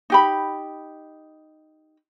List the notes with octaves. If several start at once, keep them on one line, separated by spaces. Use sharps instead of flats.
D#4 G4 B5